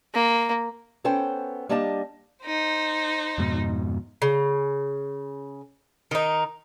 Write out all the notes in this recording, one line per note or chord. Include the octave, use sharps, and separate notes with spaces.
A#3
B3 C#4 A4 C5 G5
G3 A#3 D4 G4 D#5 A5
D#4 C5
F2 G#2 B2
C#3
D#3 D#4